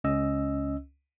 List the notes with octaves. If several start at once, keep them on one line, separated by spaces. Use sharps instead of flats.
C#2 C#4 D#5 E6